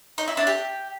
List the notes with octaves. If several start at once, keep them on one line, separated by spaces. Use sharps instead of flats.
D#4
E4
D4
G4